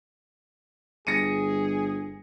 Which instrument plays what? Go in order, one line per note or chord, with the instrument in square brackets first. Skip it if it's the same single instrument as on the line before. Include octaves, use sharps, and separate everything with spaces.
[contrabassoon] G1 [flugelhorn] G#4 [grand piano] A#6 C#7 D#7